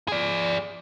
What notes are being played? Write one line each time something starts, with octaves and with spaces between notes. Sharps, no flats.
G#4 D5